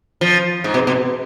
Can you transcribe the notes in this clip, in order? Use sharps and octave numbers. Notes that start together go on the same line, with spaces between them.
F3
G#2
B2
B2